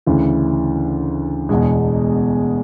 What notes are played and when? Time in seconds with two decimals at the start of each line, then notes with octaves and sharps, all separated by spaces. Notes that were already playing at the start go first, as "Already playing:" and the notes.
0.06 D2 C#3 E3
1.49 E1 E2 B2 G#3